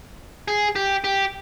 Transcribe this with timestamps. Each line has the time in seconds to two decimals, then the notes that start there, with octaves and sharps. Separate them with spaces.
0.48 G#4
0.76 G4
1.04 G4